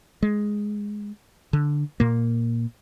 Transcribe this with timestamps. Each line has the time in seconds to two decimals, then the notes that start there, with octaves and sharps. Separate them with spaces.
0.23 G#3
1.53 D3
2.00 A#2 A#3